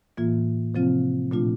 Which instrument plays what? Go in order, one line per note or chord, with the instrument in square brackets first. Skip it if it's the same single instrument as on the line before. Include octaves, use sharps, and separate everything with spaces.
[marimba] A2 E3 A#3 F4
C3 F3 C4 F4
A#2 F3 A3 D4 F4